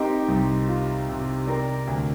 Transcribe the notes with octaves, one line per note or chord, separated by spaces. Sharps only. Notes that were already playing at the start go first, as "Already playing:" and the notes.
Already playing: C4 D#4 G4 A#4 C5
C2
F4
C3
C4 A#4 D5
D2